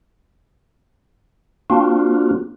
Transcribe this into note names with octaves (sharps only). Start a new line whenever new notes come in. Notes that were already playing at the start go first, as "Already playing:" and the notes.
A#3 C4 D4 F4 F#4